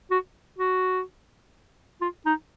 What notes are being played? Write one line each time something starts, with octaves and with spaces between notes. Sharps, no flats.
F#4
F#4
F4
D#4